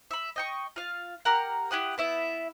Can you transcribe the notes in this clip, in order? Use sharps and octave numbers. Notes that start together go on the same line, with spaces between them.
E5 B5
D#5 G5 C#6
F4 F5
G4 A#4 F#5
E4 G4 F#5 D#6
B3 E4 E5